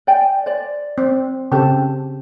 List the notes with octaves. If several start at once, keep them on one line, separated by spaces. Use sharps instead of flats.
D5 G5 G#5
C5 D5
C4
C#3 C4 G4 A4 A5